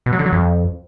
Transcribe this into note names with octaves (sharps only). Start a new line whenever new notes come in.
B2
F#3
D3
F#3
F2